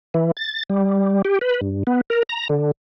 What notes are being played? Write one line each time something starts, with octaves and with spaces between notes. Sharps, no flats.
E3
A6
G3
G4
B4
G2
B3
A#4
A#5
D3